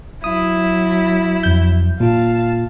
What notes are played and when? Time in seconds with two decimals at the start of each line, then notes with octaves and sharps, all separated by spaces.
0.24 F#3 E4 D#6
1.43 F2 G6
2.00 A#2 F4 F5 A5